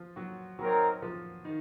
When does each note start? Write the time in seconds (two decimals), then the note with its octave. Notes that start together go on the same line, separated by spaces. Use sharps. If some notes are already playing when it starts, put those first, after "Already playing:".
Already playing: F3 F4
0.16 F#3 F#4
0.59 F#3 C4 D#4 F#4 A#4 C#5
1.02 F3 F4
1.45 D#3 D#4